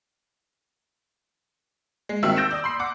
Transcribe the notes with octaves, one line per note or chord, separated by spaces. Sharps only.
G#3
G2 D#3 C4 F#4 E5 E6
E6 G6 A#6 D7 E7
D5 D#6
B5 C6 C7
F#5 D6